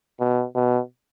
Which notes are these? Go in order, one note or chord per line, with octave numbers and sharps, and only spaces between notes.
B2
B2